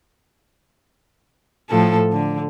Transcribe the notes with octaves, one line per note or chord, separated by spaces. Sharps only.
A2 F3 A4
D3